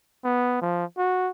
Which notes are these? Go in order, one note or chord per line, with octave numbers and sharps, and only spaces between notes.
B3
F3
F#4